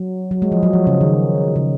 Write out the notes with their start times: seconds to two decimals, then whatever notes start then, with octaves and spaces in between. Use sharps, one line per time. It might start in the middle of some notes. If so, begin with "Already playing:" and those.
Already playing: F#3
0.31 F#3
0.42 G#3
0.52 F3
0.63 F#3
0.73 F3
0.87 C#3
1.01 D#3
1.56 C#3